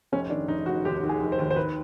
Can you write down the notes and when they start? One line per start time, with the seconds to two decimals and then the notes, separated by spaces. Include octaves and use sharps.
0.12 F1 C#4
0.30 D#3 D4
0.48 F1 D#4
0.66 F1 F#4
0.85 D#2 G4
1.03 D#3
1.09 G#4
1.21 F1
1.32 C5
1.39 D#2
1.51 C5
1.56 D#3 B4